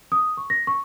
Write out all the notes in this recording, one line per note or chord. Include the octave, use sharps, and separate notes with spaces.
D#6
C#6
A#6
C#6